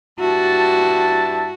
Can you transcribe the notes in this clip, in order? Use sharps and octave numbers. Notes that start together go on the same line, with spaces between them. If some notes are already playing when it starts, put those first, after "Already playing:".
G2 E4 F#4 A5